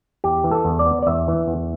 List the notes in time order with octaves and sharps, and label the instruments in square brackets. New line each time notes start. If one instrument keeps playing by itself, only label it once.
[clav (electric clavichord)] E2 G4
E3
A4
E2
D5
B3
D5
E2 E5
E3
E2